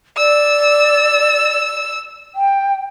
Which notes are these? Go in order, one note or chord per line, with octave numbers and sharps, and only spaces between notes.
D5 E6
G5